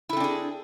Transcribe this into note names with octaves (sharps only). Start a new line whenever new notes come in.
C4 D4 E4 G#4 A4